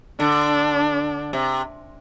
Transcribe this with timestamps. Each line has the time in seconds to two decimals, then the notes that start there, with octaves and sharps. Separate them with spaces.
0.19 D3 D4
1.33 C3